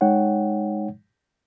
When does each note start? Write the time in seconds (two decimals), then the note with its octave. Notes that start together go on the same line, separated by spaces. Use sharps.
0.01 G#3 D#4 C#5 F#5 G5